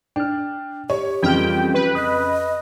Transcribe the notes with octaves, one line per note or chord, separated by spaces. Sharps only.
D4 G5 F6
G4 C#5
F2 C#3 E3 G3 F4 G5 F6
B4
D#5 D#6 F#6